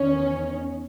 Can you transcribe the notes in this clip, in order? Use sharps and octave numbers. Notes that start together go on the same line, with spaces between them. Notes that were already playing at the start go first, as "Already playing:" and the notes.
Already playing: E2 D#3 C#4